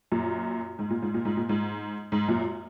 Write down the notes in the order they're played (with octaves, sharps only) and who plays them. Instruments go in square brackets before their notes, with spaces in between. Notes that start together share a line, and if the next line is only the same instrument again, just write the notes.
[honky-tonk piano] F#2 A#2
G#2
A#2
G#2
A#2
G#2
A#2
G#2
G#2
F#2 A#2